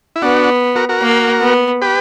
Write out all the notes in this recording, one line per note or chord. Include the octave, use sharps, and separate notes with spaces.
E4
B3 D4 F#4
F#4 A#4
F#4 A#4
A#3
B3
G4 B4